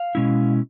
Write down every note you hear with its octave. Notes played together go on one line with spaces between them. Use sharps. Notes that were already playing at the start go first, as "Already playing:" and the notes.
Already playing: F5
B2 G#3 C#4 E4